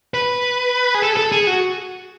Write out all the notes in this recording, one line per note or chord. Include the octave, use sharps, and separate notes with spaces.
B4
G#4
A4
G#4
A4
G#4
F#4